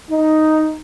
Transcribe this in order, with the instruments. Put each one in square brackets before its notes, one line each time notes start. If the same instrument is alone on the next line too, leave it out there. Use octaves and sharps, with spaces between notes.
[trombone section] D#4